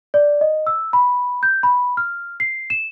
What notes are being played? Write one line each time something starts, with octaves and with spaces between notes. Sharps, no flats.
D5
D#5
E6
B5
G6
B5
F6
C7
E7